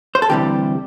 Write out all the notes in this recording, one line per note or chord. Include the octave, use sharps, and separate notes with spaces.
C5
A4
D2 C3 E3 G3 G4